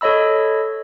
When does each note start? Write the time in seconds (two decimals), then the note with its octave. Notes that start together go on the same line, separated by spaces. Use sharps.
0.01 A4 C#5 D#5 B5 E6